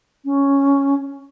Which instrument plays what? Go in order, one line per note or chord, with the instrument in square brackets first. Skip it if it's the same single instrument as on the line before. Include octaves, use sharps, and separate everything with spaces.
[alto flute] C#4